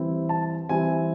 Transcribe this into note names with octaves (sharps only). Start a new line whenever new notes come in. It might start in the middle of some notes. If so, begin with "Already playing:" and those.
Already playing: E3 G3 C4 E4
A5
E3 G3 C4 E4 G#5